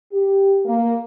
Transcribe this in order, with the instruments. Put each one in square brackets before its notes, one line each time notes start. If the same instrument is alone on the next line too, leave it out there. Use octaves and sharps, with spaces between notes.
[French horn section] G4
A#3